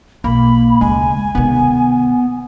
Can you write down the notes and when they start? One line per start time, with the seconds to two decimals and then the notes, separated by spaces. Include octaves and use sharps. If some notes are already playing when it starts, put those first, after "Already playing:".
0.24 B1 A#3 B5
0.81 D2 C#3 G#3 G#5
1.35 C3 D#3 B3